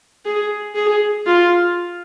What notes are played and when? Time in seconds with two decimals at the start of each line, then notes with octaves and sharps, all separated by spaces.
0.25 G#4
0.75 G#4
1.26 F4